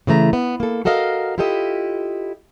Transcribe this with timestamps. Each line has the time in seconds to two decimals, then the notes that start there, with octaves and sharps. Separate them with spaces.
0.07 C#3 E3 A3 A#5
0.33 B3
0.60 A#3 A4
0.85 F#4 A4 A#4 D#5 F5
1.38 E4 F4 G4 A4 D#5